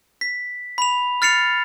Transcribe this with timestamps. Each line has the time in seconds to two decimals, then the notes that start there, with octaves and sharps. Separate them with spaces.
0.21 B6
0.78 B5 F7
1.22 F6 A6 C7 C#7 F7